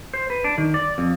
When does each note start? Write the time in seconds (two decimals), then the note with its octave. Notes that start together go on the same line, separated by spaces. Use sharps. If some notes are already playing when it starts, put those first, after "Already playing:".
0.14 C5
0.30 B4
0.44 D4
0.58 D#3
0.74 D5
0.98 F2